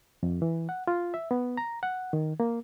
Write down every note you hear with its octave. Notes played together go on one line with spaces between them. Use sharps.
F2
E3
F#5
F4
E5
B3
A#5
F#5
D#3
A#3